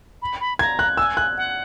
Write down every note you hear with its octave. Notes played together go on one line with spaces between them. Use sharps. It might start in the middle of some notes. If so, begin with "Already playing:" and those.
B5
B5
A#5 G#6
F#6
G#5 E6
F#6
F#5